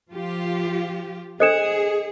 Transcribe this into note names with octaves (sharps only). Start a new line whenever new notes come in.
F3 F4 G4
D4 G#4 A4 C5 D#5 C#7 E7